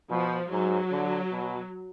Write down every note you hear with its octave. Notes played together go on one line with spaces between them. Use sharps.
B2 F3
G#2 F#3
D3
B2